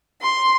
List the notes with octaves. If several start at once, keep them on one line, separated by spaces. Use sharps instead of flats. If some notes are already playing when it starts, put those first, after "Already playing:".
C6